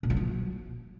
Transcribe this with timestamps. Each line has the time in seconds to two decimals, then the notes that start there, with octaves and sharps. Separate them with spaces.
0.03 A#2
0.10 F3
0.17 F#3